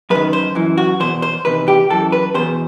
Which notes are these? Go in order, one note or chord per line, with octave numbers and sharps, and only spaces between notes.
F#2 D#3 B4
C5
F#2 E3
F#4
E2 B2 C5
C5
E2 C3 D#3 B4
G4
F#2 E3 A4
B4
E2 B2 C5